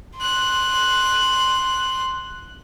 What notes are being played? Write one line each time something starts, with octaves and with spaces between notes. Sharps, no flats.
C6 F#6